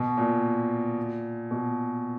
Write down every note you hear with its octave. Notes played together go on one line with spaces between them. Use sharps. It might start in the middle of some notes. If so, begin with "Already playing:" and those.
Already playing: B2
A#2
B2